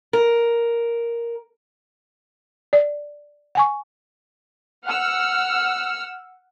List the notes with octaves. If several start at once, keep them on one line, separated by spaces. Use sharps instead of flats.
A#4
D5
F#5 G#5 C#6
F#5 E6 F6